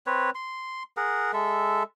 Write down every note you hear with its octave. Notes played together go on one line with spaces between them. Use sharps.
C4 B4 C#5
C6
G#4 A#4 F#5
G#3 A4 E5